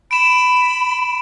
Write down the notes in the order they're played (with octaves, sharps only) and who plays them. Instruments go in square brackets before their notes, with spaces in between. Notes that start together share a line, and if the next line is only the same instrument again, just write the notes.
[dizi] B5 [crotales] D7 E7